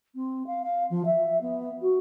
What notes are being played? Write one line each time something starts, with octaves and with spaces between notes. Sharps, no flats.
C4
F5
F5
F3
E5
B3
F#4